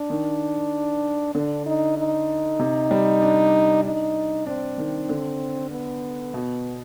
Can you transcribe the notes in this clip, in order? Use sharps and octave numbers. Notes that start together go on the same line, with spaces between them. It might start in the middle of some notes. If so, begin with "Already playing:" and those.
Already playing: D4
D#3
D3 D4
D#4
D#4
C3
G3
D4
D#4
C4 D4
D#3
D3
B3
B2